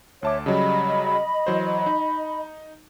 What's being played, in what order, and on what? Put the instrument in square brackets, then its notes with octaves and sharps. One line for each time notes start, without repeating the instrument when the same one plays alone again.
[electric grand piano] D2 A5 D6 [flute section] C#5 E5
[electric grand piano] C#3 F#3 G3 [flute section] D#5 B5
[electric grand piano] E3 F#3 C5
D#4